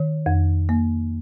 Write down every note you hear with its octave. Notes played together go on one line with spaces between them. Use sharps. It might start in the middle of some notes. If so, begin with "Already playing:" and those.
Already playing: D#3 C#5
F2
A#3